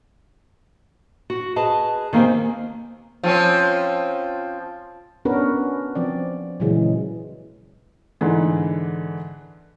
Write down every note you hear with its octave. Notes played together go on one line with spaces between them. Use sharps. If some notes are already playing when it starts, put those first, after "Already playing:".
F#4
G#4 B4 D#5 A5
D#3 A#3 C4 G4 G#5
F3 C4 C#4
B3 C#4 D4 F#4 A#4 B4
F3 C4 D5
A#2 C#3 E3 F#3 G#3
G#2 D3 E3